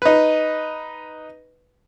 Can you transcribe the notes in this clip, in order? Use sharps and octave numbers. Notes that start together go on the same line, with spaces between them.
D#4 B4